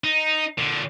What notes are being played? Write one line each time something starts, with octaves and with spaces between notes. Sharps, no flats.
D#4
A#2 D3